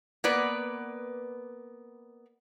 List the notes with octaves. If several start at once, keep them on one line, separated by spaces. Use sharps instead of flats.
A#3 B3 B4 D5